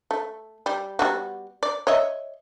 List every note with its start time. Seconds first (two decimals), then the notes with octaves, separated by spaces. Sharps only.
0.11 A3
0.66 G3
0.99 G3 B3 F#4
1.63 D5
1.87 C#5 D#5 E5